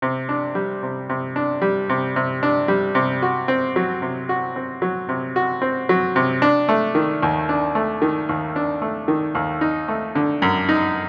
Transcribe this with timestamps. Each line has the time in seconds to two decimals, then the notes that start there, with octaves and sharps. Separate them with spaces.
0.02 C3
0.29 D4
0.55 G3
0.83 C3
1.09 C3
1.36 D4
1.62 G3
1.89 C3
2.16 C3
2.43 D4
2.68 G3
2.95 C3
3.22 F#4
3.48 C4
3.76 F#3
4.02 C3
4.29 F#4
4.56 C4
4.82 F#3
5.09 C3
5.36 F#4
5.62 C4
5.89 F#3
6.16 C3
6.42 D4
6.69 A3
6.95 D#3
7.23 D#2
7.49 D4
7.75 A3
8.02 D#3
8.29 D#2
8.56 D4
8.82 A3
9.08 D#3
9.35 D#2
9.61 D#4
9.88 A3
10.15 D3
10.42 F#2
10.69 D#4